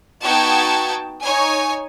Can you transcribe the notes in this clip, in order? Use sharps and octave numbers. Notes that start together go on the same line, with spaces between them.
B3 D#4 F#4 G5 A5 G#6
D#4 C#5 G#5